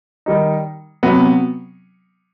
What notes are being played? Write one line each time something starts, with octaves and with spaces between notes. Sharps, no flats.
D#3 G3 D#4
C3 F#3 B3